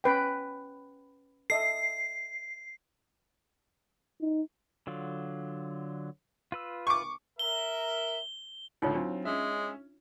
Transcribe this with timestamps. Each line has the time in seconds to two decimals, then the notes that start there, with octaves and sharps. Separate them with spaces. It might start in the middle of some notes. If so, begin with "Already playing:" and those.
0.04 C#4 B4 G5
1.50 A4 D#5 E5 C7
4.21 D#4
4.87 D3 F#3 F4
6.52 F4 B4 E6
6.87 C#6 D6
7.39 A#4 E5 G7
8.82 C#2 A2 D3 D#4 F4 C#5
8.95 F#3 C4 D4 F4
9.25 G#3 C#4 E5